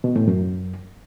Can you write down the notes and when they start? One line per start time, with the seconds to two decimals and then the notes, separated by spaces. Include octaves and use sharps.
0.04 B2
0.16 A2
0.27 F#2